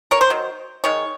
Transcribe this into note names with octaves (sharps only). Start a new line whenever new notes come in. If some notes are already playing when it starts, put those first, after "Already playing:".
A#4 C#5
C5
D#3 F#3
D#3 G#3 C#5